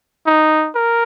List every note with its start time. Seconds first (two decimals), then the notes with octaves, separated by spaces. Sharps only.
0.26 D#4
0.75 A#4